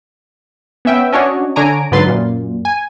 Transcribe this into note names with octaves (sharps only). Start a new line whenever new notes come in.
B3 C#4 E5 G5
C#4 D4 F#4 C#5 D#5
D3 D4 C#5 G#5 A#5 D7
G#2 D3 F#3 B4 C6 A6
F#2 A#2
G#5